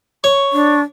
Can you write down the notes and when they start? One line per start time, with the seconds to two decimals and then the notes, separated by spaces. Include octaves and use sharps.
0.24 C#5 C#6
0.52 D4